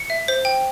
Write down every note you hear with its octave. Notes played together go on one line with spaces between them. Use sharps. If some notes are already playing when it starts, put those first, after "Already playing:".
Already playing: C#7
E5
C5
G5